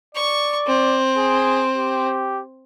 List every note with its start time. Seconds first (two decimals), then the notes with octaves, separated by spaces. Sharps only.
0.15 D5 C#6
0.67 C4
1.17 G#4
1.76 G4